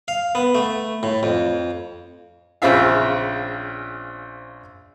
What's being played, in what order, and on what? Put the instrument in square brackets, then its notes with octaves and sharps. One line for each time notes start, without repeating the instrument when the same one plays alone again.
[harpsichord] F5
B3
A3
A2
F2
[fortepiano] A#1 C#3 C4 F4 E5 F5